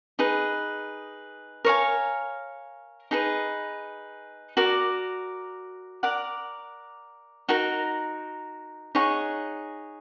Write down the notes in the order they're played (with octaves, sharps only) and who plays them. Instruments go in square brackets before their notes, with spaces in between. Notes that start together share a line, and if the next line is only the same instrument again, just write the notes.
[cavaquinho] D#4 G#4 B4
A#4 C#5 F5 G#5
D#4 G#4 B4
F#4 A#4 D5
A#4 D5 F#5
D#4 F#4 A#4
D#4 G#4 C#5 F#5